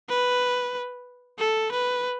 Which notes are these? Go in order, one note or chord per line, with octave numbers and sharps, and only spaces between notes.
B4
A4
B4